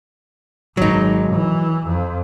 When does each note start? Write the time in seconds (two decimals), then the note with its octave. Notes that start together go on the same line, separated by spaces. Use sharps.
0.77 G#1 F#3 D#4
1.33 E3
1.86 F2